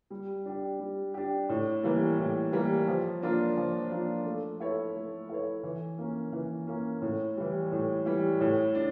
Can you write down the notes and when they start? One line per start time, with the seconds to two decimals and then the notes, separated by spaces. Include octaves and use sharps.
0.10 G3
0.45 D4 G4
0.80 G3
1.14 D4 G4
1.49 A2
1.83 E3 G3 A#3
2.18 A2
2.52 E3 G3 A#3
2.88 F3
3.22 A#3 D4 F4
3.57 F3
3.91 A#3 D4 F4
4.25 A3
4.60 E4 A4 C#5
4.95 A3
5.29 E4 A4 C#5
5.63 E3
5.98 A#3 C#4
6.32 E3
6.67 A#3 C#4
7.02 A2
7.37 E3 G3
7.72 A2
8.06 E3 G3
8.40 A2
8.75 D4